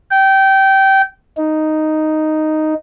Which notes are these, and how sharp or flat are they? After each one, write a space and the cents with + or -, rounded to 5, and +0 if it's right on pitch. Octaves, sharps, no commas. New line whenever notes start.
G5 -20
D#4 +0